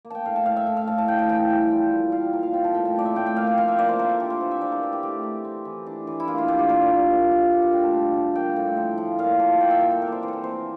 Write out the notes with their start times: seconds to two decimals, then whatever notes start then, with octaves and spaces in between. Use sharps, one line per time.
0.05 A#3
0.10 G5 A5
0.26 A2 F5
0.36 A5
0.46 A2 F5
0.57 E5
0.67 A2
0.77 F5
0.87 A2 A5
0.98 A5
1.08 A2 G5
1.19 G5
1.29 E3 G5
1.50 G3
1.71 F3
1.91 A#2
2.12 F3 F5
2.33 A#2 A#4
2.43 F5
2.53 C4 G5
2.64 A5
2.74 A2 G5
2.85 A5
2.96 C4 D5
3.05 E5
3.16 A2 G5
3.27 G5
3.36 A#3 F5
3.47 G5
3.58 F3 F5
3.68 E5
3.79 A#3 D5
3.89 C5
3.99 D4 A#4
4.10 A4
4.20 C4 G4
4.30 F4
4.41 E3 C5
4.51 E5
4.61 C4 D5
4.72 A#4
4.83 E3 A#4
4.93 G4
5.03 A3 G4
5.23 A3
5.45 C4
5.65 E3
5.86 D4
6.07 E3
6.20 E4
6.27 A#3 F4
6.38 F4
6.48 D4 G4
6.59 G4
6.69 A#2 A#4
6.90 A#2
7.11 A#2
7.31 D4
7.52 D3 D5
7.62 F5
7.73 A3 G5
7.84 A5
7.94 G2
8.14 G2
8.35 A#3 G5
8.56 A2
8.77 F3
8.98 F3
9.19 A#2 F5
9.39 A#3 A5
9.60 A#3 G5
9.71 E5
9.81 F3 A#4
9.91 A4
10.02 C3 A#4
10.08 C5 D5
10.22 E3 C5
10.28 A4 A#4
10.44 C3 C5